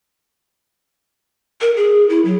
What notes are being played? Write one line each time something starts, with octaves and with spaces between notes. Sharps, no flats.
A#4
G#4
E4
F#3